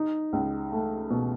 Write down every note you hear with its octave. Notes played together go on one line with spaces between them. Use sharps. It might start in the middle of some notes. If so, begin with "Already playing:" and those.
Already playing: D#4
C#2
A3
B2